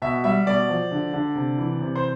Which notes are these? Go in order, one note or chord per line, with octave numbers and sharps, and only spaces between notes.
B2 E5
G3 E5
B2 D5
F3
D3
D3
C3
E3
C3
C5